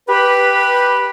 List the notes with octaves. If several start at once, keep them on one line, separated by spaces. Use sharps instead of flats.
G4 B4 B5